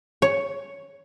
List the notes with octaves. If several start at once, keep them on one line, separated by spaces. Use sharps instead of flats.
C#5